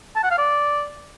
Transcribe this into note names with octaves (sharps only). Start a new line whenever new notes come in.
A5
F#5
F5
D5